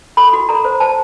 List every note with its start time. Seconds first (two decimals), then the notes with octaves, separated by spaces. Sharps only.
0.17 A4 B5
0.33 F#4
0.49 A4 A#5
0.65 C5
0.80 C5 A5